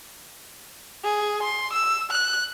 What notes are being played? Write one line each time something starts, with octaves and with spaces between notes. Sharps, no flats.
G#4
C6
E6
F#6